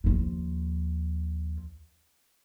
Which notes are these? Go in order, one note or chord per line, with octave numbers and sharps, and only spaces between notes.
D#2 F3